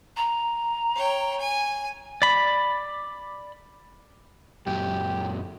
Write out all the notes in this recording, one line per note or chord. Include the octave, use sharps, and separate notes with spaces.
A#5
C#5 G5
G#5
D5 B5
F#2 A#2 F#3 G4